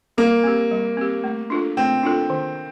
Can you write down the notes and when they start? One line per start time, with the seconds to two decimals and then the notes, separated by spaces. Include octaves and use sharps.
0.18 G3 A#3
0.44 C4 G4
0.71 G3
0.97 C4 G4
1.24 A3
1.50 D4 F4 A4
1.77 A3 C4
2.03 D4 F4 A4
2.30 D#3